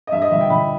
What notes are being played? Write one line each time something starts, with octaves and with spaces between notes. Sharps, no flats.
D#5
G2 E5
D#5
G1 E5
G5
G1 B5